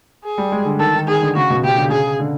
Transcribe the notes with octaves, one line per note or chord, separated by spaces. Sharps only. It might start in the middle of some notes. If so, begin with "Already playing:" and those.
G#4
G3
G#3
D3
D#3 A4
D#3
D#3 G#4
D3
C#3 F#4
B2
C#3 G4
D3
C#3 G#4
D3